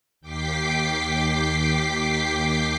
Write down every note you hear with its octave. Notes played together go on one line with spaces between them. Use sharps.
D#2 G5 D6 B6 C7